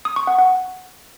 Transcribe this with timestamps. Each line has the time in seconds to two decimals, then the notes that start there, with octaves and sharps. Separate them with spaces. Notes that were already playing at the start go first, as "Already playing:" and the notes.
0.05 D#6
0.16 C#6
0.27 F#5
0.38 F#5